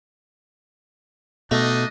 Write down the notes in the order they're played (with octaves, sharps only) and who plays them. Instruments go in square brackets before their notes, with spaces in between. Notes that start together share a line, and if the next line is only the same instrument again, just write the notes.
[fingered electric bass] B2 [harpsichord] A3 [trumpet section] D4 D#4 D#5